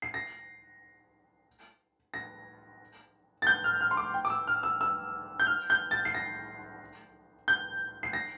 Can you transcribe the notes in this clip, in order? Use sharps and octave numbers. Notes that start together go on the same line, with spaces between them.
C7
A#6
A#6
A6
G6
F6
F6
C6
D6
G5
D6
E6
F6
E6
E6
G6
F6
G6
A6
C7
A#6
G6
C7
A#6